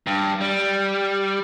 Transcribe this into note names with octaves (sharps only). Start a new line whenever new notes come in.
G2
G3